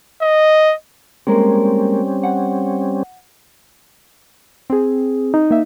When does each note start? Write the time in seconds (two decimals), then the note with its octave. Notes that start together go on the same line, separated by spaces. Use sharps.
0.22 D#5
1.27 G3 G#3 A#3 C4 C#4 A#4
2.24 F#5
4.70 C4 G#4
5.34 D#4
5.51 A#3 E5